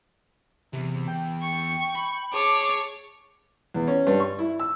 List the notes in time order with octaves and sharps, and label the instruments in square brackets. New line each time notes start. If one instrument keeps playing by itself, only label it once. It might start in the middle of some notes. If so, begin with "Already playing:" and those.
[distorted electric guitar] E2 E3 [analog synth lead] C3
[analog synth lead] G5
[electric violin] C#6
[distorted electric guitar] B5
[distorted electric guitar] G#4 [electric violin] C#5 [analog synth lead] A5 [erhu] D6
[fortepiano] E2
C#4
G2
C#6
E4
E6